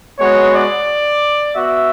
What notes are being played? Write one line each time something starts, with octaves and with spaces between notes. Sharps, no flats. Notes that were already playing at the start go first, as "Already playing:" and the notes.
G#3 B3 F#4 C#5
D5
B3 F#4 E5